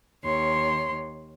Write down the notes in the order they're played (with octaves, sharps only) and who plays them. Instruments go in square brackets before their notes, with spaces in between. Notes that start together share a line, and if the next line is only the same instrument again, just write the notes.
[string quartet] D#2 C#5 C6